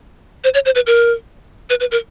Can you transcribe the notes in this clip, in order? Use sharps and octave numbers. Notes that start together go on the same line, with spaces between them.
C5
C#5
C5
B4
A#4
B4
B4
A#4